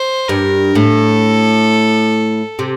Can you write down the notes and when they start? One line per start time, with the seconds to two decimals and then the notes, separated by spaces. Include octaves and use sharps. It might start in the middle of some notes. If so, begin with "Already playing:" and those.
Already playing: C5
0.29 G2 A#4
0.75 A2 A4
2.59 C3